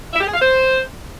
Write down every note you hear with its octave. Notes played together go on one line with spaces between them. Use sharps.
E5
G4
G#4
F5
C5